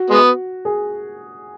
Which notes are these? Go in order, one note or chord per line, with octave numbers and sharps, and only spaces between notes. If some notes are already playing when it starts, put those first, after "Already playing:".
Already playing: F#4
G#3 B3
G#4